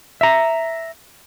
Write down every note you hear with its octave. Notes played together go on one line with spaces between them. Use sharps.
E5 A#5